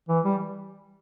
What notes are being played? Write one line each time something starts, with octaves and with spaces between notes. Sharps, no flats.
E3
G3